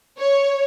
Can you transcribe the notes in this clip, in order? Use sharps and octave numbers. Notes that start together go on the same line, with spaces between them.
C#5